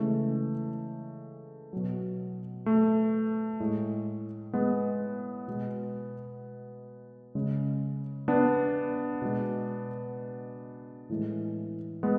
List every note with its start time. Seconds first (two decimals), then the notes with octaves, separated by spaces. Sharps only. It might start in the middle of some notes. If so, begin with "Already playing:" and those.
Already playing: C#3 E3 G#3 A3
1.73 B2 F#3
2.66 A3
3.60 A2 G#3
4.53 G#3 B3
5.48 B2 G#3
7.35 C#3 G#3
8.28 B3 D4
9.22 B2 G#3
11.09 A2 E3 G#3
12.03 G#3 B3